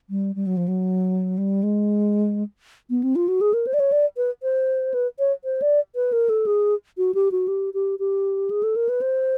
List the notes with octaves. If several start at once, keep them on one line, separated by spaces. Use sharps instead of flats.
G3
G3
F#3
F3
F#3
G3
G#3
B3
C4
F4
F#4
G#4
A#4
C5
D5
C#5
D5
B4
C5
B4
C#5
C5
D5
B4
A#4
A4
G#4
F#4
G4
F#4
G4
G4
G4
G#4
A4
A#4
B4
C5